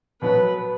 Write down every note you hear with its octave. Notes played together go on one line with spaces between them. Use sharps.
B2 F#3 B3 B4